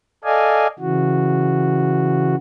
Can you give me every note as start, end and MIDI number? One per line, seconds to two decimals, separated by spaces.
0.24 0.67 69
0.24 0.67 74
0.24 0.67 75
0.24 0.67 77
0.24 0.67 80
0.79 2.35 49
0.79 2.35 52
0.79 2.35 66